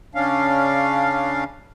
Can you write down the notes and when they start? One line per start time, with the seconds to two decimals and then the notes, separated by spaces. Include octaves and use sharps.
0.15 C#3 C#4 D4 F5